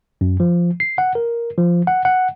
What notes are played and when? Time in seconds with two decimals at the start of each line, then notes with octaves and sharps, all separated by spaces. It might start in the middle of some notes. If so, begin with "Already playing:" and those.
0.21 F#2
0.40 F3
0.80 C7
0.98 F#5
1.15 A#4
1.58 F3
1.87 F#5
2.05 F#5